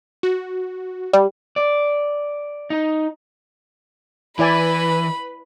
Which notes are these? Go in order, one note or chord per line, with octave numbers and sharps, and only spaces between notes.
F#4
G3
D5
D#4
E3 E4 B4 D5 G#5 B5